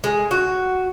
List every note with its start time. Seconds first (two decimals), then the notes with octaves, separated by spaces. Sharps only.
0.04 G#3
0.31 F#4